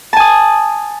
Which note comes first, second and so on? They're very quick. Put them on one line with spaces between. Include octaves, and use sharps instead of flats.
A5 G#5 D#6